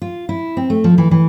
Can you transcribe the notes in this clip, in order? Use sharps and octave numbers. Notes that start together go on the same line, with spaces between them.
F4
E4
C4
A3
F3
E3
E3